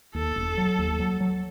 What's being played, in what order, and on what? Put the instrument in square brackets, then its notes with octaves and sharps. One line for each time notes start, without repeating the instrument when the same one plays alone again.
[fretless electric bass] D#2 [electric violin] A4
[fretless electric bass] E1
F#3
D#2
F#3
F#3